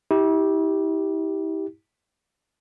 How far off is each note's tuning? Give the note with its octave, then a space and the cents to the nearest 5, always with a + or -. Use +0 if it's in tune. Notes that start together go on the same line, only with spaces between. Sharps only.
E4 -40 G4 +0